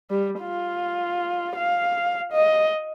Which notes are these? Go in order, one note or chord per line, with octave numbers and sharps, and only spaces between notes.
G3
F4
F5
D#5